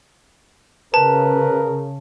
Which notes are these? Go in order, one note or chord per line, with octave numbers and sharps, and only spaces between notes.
C#3 A#4 B4 A5